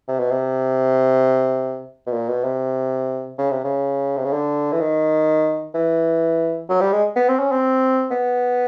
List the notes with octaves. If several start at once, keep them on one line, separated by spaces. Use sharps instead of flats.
C3
B2
C3
B2
A#2
B2
C3
C#3
C3
C#3
C3
C#3
D3
E3
D#3
E3
F#3
G3
G#3
B3
C4
C#4
C4
B3